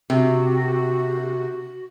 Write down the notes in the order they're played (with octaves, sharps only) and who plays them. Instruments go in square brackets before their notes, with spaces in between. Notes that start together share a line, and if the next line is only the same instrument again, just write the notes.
[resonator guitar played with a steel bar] C3 [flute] F#4